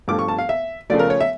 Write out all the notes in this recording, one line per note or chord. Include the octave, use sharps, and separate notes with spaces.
G2 F3 A3 D6
C#6
A5
F5
E5
C#3 F3 A3 D5
A#4
C#5
E5